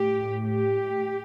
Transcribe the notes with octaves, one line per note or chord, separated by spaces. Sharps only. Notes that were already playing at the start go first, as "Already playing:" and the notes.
Already playing: A2 G4
G4